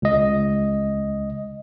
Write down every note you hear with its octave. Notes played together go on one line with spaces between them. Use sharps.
C#2 D#5